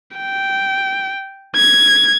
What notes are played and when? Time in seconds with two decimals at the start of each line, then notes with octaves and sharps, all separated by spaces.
0.17 G5
1.56 G#6